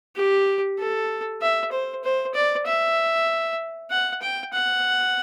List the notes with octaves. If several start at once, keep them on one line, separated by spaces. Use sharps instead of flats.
G4
A4
E5
C5
C5
D5
E5
F#5
G5
F#5